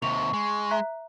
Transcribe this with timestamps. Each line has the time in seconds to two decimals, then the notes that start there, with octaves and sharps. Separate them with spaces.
0.02 D#2 C3 C#6 F7
0.33 G#3
0.71 E5 A#5 F#6